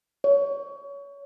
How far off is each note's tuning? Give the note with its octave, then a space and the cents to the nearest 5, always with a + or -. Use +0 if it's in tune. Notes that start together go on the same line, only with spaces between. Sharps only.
C#5 +25